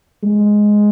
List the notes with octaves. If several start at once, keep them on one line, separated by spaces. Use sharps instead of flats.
G#3